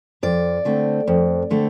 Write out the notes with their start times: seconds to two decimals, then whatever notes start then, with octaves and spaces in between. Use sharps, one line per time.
0.23 F2 D5
0.65 D3 A3 C4
1.08 F2
1.51 D3 A3 C4